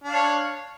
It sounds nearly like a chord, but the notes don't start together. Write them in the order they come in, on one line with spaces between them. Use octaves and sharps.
D4 F5 C#5